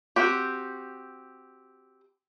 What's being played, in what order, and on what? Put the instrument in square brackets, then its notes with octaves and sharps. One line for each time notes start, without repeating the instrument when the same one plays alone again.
[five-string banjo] C4 F#4 G4